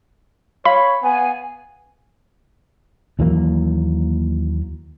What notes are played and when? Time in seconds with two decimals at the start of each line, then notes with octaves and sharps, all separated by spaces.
0.65 C#5 F5 B5
1.03 B3 G#5
3.19 D#2 E3 F#3 A#3